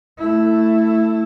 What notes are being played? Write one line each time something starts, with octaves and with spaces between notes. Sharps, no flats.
A3 E4